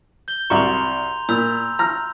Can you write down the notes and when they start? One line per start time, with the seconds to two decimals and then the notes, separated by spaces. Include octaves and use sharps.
0.28 G6 G7
0.50 C2 F#3 A#5 C6 C#6 F7
1.29 A#2 B5 E6 G6
1.79 A#5 F6